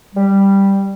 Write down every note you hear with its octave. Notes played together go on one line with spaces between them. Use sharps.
G3